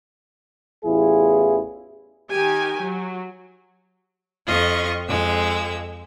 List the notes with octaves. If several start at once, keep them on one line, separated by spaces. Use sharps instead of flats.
A1 E2 E4 F4 G#4
D#3 G4 G#5
F#3
F2 F4 D#5 C#6
F2 G#3 E6